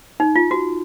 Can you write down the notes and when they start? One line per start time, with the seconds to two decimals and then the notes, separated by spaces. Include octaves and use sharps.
0.20 D#4
0.36 F4
0.51 F#4